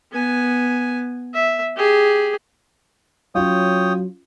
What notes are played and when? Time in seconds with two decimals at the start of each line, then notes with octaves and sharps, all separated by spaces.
0.11 B3 G#5
1.34 E5
1.76 G4 G#4
3.35 F#3 C#4 F4 C#5 G5 D#6